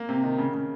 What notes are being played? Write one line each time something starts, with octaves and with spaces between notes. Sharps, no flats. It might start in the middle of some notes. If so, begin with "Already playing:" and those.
Already playing: A#3
C3
D#3
C#3
C#3